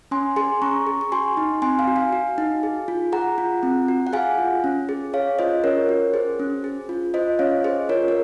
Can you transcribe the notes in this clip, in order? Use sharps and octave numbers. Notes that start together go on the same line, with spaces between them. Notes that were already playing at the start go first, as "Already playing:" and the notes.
C#4 G#5 C6
G#4 G#5 C6
C#4 A#5 C#6
G#4
C#6
F#4 G#5 C6
D#4
C4 G#5 C6
F5 G#5
F#4
F5 G#5
F#4
D#4
G#4
F4
G#4 F#5 A#5
F4
C4
F#4
F#5
G#4 F5 G#5
F4
C#4
G#4
G#4 C#5 F5
F4 C5 D#5
C#4 A#4 C#5
F#4
G#4 C5
C#4
G#4
F4
F4 C5 D#5
C#4 C#5 F5
G#4 C5 D#5
F4 A#4 C#5
A#4